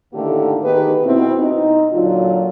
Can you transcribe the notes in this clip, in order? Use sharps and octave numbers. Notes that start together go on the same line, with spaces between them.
A2 D3 D#3 A3 A#3 G4
D#3 B3 D#4 G4 G#4 B4
B2 C4 E4
D#4
A#2 D3 F#3 F4